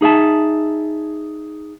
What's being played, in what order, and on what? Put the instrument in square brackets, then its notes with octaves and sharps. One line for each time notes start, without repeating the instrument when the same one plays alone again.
[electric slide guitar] D#4 G#4 E5 A5